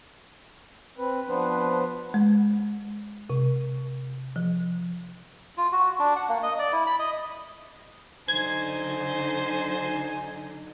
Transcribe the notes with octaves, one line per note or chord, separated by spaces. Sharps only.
C4 B4
F3 B3 D4 B4 C5
G#3
C3
F3
F4
F#4
D4
F#5
A#3
D#5
D5
E4
B5
D#5
D3 F#3 D#4 C5 G#5 G#6